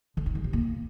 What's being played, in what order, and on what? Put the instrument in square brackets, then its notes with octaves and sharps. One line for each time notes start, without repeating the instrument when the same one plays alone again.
[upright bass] D3
D#4
G3
C3
A#3